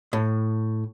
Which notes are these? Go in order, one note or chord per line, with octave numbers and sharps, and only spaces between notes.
A2